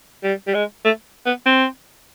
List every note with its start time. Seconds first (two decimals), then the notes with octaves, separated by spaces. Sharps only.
0.24 G3
0.47 G3
0.54 G#3
0.85 A3
1.26 B3
1.46 C4